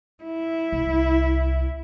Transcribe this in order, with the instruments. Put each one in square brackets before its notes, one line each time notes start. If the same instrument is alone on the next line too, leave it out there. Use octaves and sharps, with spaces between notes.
[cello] E4
[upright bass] C2